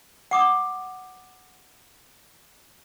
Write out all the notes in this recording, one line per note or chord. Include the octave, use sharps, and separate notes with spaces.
F#5 D6 D#6